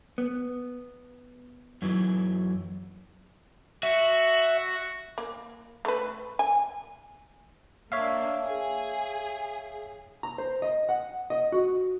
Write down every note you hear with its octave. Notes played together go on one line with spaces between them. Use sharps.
B3
F#2 E3 F#3
F#4 E5
A#3
A3 B4
G#5
A#3 D4 C#5 E5 F5
G#4
A#5
C5
D#5
F#5
D#5
F#4